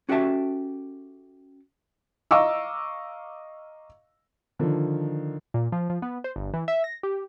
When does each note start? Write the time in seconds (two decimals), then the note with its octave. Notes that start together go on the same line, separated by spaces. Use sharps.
0.09 C#4 F#4 G4 A4 E5 A5
2.31 D#5 F5 A#5 C#6 D6 E6
4.59 D3 D#3 F3
5.54 A#2
5.72 F3
5.90 F3
6.02 B3
6.24 C5
6.36 G1
6.54 E3
6.68 E5
6.84 A#6
7.03 G4